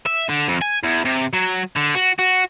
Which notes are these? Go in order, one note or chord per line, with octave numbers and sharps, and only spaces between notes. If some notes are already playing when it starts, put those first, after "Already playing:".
E5
D3
F2
G#5
E2
C3
F#3
D3
F#4
F#4